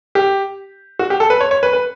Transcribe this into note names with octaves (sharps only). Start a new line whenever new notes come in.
G4
F#4
G4
A4
B4
C#5
C#5
B4
B4